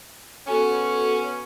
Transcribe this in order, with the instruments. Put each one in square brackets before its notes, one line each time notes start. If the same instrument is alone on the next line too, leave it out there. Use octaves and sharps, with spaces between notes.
[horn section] B3 C#4 [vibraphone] F#4 A4 G#5